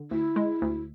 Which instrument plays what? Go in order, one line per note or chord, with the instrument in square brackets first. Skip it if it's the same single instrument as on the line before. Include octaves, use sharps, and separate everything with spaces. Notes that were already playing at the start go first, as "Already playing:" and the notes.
Already playing: [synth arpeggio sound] D3
[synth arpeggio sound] D2 [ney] E4
[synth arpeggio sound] G#3
D2